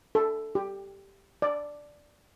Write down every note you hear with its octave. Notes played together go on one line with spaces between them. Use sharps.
A4
G4
D5